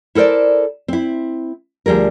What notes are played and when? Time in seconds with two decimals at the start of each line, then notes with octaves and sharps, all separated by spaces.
0.15 E4 A4 A#4 C5 D5
0.88 C4 E4
1.86 D2 F3 G3 G#4 A#4